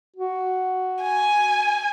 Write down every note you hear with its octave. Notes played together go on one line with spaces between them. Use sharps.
F#4
G#5